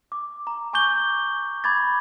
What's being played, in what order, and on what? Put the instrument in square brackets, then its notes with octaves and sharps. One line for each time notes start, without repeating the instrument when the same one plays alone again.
[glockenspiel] D6
A#5
G#5 C#6 D6 G6 G7
B5 D6 G#6 A6